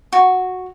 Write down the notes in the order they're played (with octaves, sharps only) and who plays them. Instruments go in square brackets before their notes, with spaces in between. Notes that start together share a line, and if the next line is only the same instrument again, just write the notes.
[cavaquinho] F#4